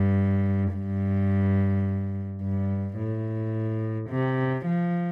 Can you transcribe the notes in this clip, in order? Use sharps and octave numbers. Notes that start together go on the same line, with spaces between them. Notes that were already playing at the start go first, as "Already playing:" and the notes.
Already playing: G2
G2
G2
A2
C3
F3